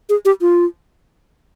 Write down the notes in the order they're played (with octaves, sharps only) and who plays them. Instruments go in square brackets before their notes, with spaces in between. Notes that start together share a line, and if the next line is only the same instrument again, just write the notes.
[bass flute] G#4
G4
F4